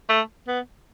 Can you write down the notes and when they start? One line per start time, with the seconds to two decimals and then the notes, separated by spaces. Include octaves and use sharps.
0.09 A3
0.48 B3